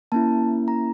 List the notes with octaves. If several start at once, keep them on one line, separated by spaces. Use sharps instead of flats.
A#3 C#4 E4 A5
A#5